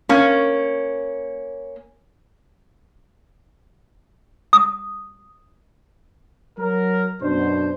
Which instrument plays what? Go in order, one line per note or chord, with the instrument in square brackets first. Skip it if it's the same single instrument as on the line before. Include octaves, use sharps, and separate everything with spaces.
[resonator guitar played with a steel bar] A#3 C#4
[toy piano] D#6
[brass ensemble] F#3 A#4
F#2 B2 D4 C5